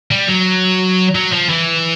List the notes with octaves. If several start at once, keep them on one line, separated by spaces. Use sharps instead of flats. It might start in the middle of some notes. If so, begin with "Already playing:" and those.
G3
F#3
F#3
F3
E3